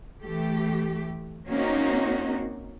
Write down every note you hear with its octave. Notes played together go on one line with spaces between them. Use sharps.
E3 A3 G4
A#3 C4 C#4 D#4 F#4